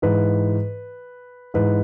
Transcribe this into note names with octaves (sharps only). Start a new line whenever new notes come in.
G#2 E3 B4
G#2 E3 B4